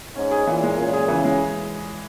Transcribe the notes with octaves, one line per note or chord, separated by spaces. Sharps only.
G#2 C#4
G#4
A#2 E3
G#3
A#2 C#4
G#4
C#3 E3
G#3